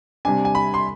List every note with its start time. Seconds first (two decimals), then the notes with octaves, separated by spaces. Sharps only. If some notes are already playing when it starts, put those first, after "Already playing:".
0.25 C3 G3 D4 G#5
0.45 G#5
0.55 B5
0.74 C6